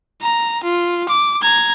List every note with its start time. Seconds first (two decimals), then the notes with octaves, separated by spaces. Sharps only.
0.22 A#5
0.64 F4
1.09 D6
1.42 A#5 G#6